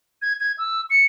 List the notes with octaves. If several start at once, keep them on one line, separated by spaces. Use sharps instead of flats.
G#6
G#6
E6
C#7